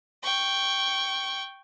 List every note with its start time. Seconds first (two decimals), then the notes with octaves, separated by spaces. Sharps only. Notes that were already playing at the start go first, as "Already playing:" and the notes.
0.24 G5 C#6